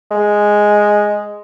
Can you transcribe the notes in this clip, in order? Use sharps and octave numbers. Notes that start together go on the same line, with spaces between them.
G#3